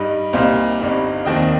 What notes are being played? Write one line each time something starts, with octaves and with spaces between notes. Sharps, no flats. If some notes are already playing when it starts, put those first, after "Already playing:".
Already playing: G2 G3 D#4
C2 A#2 G3 D#4 C5 F5
G1 G2 G3 C4 D#4
F1 D#2 D#3 C4 D#4 D#5 G5